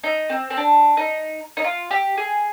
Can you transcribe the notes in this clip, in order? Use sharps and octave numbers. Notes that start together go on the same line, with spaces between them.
D#4
C4
C4
D4
D#4
D#4
F4
G4
G#4